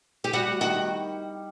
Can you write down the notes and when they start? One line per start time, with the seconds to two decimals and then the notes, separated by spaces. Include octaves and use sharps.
0.24 G4
0.33 G3 F#4
0.61 D#3 F#4